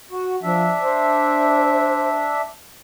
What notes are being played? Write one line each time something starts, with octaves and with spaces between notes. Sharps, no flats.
F#4
F3 D4 E5
C5